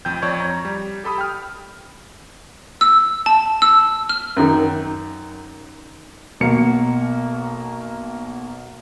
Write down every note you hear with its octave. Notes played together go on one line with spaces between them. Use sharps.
A1 F2 G5 G6
F2 C#5 D5 C#6 G#6
A#5
G3
G4 A4 B5 D#6
G5 F6
E6
A5
E6
F6
F#2 D#3
B1 B2 A#3 C#7